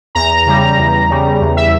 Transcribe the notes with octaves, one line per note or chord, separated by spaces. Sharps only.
E2 A#5
C#3 G3
E2
C#3 G3
E2
E5